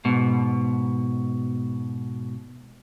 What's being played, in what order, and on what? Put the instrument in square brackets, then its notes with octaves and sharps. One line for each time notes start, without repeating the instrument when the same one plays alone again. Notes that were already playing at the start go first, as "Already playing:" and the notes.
[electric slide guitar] G#2 B2